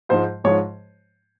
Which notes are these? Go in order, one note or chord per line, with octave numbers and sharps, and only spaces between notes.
G#2 F3 G#3 C5
G#2 F3 G#3 C#5